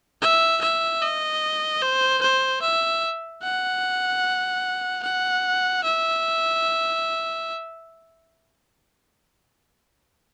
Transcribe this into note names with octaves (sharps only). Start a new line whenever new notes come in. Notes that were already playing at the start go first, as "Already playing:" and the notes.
E5
E5
D#5
C5
C5
E5
F#5
F#5
E5